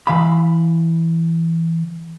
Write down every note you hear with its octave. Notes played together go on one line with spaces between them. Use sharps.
E3 F5 B5